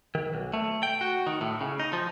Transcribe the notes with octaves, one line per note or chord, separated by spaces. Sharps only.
D#3
B1
A3
G5
F#4
D#3
A2
C#3
D#4
F3